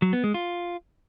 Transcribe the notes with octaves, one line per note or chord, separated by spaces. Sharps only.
F#3
B3
G#3
F4